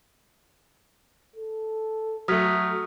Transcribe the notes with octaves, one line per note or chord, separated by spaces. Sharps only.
A4
F#3 A3 D#6 F6 B6